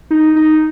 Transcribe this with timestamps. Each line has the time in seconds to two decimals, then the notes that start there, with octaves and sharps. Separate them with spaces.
0.11 D#4
0.36 D#4